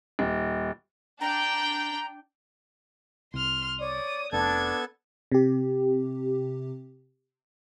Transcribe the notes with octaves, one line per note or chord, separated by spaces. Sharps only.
D#1
D4 G5 A#5
C2 C6 F6
C#5 D5 D#6
F1 B3 D4 A4 A5 G#6
C3 G4